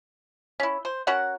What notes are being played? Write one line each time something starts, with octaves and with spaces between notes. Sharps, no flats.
C#4 E4
C5
C#4 F#4 A#4 F#5